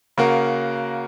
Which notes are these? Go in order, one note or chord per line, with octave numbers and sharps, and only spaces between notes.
C#3 A#3 F#4 A#4